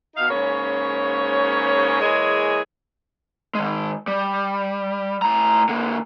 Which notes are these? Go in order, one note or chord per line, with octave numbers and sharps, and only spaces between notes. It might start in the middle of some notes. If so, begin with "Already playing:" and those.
B2 D#4 F5
G#2 C#3 A#3 C#4 C#5
E3 G#3 A#3 G#4 C#5
D#3 G#3
G3
A2 A#5
D3 A#3